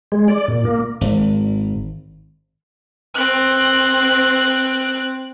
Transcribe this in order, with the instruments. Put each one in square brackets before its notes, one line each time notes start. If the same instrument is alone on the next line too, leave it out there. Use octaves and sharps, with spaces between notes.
[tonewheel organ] G#3
D5
A#2
A#3
[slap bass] G#1
[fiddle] C4 F#6